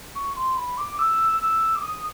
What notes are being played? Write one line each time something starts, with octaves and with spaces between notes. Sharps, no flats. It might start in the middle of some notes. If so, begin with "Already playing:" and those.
C#6
C6
B5
D6
E6
E6
D6
D#6